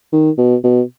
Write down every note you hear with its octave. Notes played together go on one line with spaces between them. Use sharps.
D#3
B2
B2